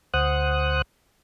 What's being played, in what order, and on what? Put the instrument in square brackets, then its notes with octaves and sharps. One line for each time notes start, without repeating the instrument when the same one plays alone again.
[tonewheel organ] D2 C5 F#5 D#6 F#6